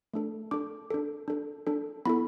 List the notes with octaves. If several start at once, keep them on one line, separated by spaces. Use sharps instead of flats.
A3 D4 A4
D4 A4 D6
D4 A4
D4 A4
D4 A4
B3 E4 A4 B5